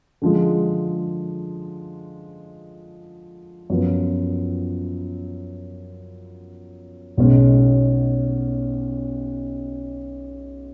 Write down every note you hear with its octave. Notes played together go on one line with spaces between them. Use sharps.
D3 F3 G#3
F#2 F3 B3 F4
B1 B2 G#3 C#4